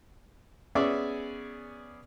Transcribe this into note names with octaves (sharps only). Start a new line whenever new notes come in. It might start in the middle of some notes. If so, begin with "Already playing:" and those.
B3 C#4 G#4 D5 E5